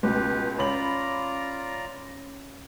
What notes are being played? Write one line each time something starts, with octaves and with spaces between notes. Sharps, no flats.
C#2 B2 G4 B4
C#4 F4 D5 A#5 B5 F#7